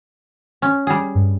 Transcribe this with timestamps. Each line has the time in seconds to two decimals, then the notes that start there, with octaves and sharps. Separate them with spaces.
0.62 C#4
0.87 G3 G#4
1.15 G2